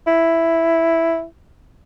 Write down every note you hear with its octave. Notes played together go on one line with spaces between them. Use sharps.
E4